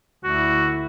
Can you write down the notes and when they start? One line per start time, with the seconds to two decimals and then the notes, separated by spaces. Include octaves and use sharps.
0.24 D2 E4 F#4